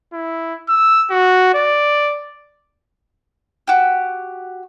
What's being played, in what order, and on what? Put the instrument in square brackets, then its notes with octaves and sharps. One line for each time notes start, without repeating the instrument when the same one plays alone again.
[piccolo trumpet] E4
E6
F#4
D5
[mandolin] F#4 G4